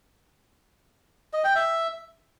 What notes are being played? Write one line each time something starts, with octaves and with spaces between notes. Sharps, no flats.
D#5
G5
E5